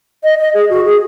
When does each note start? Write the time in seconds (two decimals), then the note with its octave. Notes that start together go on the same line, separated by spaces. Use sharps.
0.24 D#5
0.39 D#5
0.54 G#4
0.70 F#4
0.85 G#4